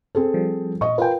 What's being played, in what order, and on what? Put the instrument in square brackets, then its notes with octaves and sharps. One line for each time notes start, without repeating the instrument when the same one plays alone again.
[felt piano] C4 G#4 A4
[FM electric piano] F3 G3
[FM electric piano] A#2 [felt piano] D#5 C#6
[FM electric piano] F4 B4 [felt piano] A#4 G5